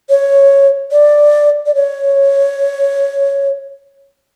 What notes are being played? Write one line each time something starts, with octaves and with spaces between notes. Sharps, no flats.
C#5
D5
D5
C#5